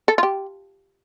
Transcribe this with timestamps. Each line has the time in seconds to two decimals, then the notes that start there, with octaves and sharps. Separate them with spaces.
0.08 A4
0.18 F4
0.23 G4